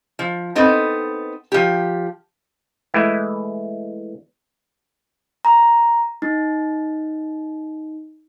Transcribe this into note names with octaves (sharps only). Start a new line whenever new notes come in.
F3
B3 C4 D#4 A4
F3 G4
E3 G#3 A3 E4
A#5
D#4